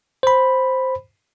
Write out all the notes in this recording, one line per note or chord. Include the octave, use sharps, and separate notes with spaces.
C5 B5